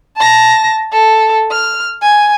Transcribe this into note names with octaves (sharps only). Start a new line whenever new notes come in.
A5 A#6
A4
F6
G#5